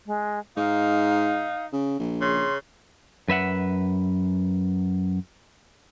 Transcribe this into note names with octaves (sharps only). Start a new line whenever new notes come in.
G#3
G#2 D#4 F5
C#3
A#1
C#3 C6
F#2 B4 E5 F#5